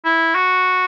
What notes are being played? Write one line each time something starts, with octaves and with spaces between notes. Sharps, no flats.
E4
F#4